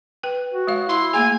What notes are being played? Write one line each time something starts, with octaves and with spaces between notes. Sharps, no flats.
B4 G5
F#4
G#3 C#5 F5
E4 C6
A3 A#3 G#4 G#5